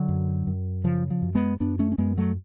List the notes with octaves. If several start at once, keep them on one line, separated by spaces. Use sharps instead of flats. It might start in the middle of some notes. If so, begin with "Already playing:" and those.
Already playing: D3 F#3
F#2
F#2
C#3 F3
F3
F#2
G#3 B3
F#2 B3 D4
A3 C#4
C#4
F#2 G#3 B3
F#3 A3